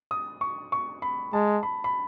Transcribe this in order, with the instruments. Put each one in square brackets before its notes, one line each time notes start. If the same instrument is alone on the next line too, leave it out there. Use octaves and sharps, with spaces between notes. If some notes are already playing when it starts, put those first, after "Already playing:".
[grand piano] D#6
C#6
C#6
B5
[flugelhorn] G#3 [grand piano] A5
[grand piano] B5
B5